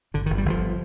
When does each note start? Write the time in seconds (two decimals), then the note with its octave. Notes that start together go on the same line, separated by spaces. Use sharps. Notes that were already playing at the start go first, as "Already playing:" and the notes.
0.14 G1 D3
0.26 D#3
0.30 G1
0.38 G3
0.45 G1 F3